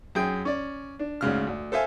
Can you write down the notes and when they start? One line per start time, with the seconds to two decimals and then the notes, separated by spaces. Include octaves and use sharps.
0.15 F#2 G#4 G5
0.45 C#4 D5
0.99 D4
1.21 D2 G#2 C#3 F6
1.47 D2
1.72 A4 C5 E5 F5 G#5